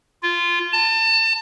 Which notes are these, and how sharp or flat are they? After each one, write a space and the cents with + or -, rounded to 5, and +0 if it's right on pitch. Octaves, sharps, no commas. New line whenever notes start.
F4 -15
A5 +30